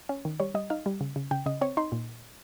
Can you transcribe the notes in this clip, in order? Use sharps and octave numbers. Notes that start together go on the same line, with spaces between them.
C#4
D#3
G3 C#5
G3 D#5
D#4 F5
G3
C#3
C#3
C#3 G5
C#3 D#5
C4 C#5
D#4 C6
A#2